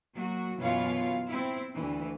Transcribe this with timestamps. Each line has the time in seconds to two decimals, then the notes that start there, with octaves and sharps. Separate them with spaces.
0.15 F#3 A#3 F#4
0.60 F#2 B2 E3 F4 C#5 F5
1.28 C4 E4
1.75 D2 E3